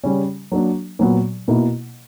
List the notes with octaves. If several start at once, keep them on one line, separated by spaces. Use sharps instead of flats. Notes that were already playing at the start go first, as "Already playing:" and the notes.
C#3 G3 C#4
F#3 A#3 D4
A#2 F#3 B3
B2 A#3 E4